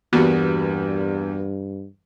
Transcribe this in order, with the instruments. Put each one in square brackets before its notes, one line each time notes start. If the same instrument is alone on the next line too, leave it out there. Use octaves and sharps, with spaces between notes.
[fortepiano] E2 G3 [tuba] G2 [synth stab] A#3 B3 F#4